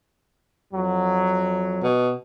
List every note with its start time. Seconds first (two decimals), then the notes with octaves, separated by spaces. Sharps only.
0.74 F2 F#3
1.84 B2